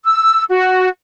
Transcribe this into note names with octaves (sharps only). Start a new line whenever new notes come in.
E6
F#4